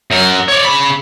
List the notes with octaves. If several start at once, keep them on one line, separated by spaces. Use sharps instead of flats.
F#2 A#4
C#5 D5
C#3 B5